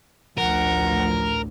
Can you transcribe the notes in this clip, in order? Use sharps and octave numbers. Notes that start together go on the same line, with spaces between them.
A1 D2 F3 A#4 F#5